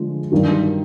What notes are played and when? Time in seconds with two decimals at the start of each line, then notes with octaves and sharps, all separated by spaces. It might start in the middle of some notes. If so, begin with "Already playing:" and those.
Already playing: D3 F3 G#3
0.32 G2 D#3 F#3